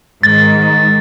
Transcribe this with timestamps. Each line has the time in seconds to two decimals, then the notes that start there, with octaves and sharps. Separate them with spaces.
0.23 G#2 D#3 A6